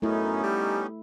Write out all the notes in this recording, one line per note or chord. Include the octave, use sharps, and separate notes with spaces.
F#2 A3 B3 C#4 D#4 E4
G3